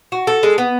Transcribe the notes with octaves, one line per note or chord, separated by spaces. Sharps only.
F#4
A4
G#3
B3